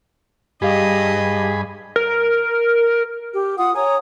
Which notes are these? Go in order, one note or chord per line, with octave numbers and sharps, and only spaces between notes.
G2 G4 G#4 D#5 F5 B5
A#4
G4
F4 F#5 D#6
C#5 G#5 A#5 D#6